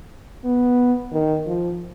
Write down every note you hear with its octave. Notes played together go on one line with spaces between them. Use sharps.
B3
D#3
F3